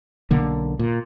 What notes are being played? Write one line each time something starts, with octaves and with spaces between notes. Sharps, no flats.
B1 B2 D3 A#3
A#2